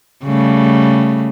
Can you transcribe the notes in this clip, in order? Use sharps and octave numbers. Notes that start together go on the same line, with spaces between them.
C#3 G3 A3